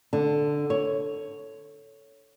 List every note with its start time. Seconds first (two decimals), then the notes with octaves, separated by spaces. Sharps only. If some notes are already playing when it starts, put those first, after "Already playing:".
0.13 D3
0.70 C#5